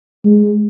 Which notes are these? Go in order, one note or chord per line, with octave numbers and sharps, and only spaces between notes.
G#3